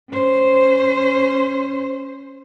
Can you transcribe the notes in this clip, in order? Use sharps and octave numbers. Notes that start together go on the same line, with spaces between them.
C#4 C5